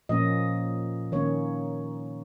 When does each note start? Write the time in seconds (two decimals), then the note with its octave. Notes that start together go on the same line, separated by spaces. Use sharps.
0.09 A#2 F3 A#3 C#4 D#5
1.12 D#3 A#3 C#4 C#5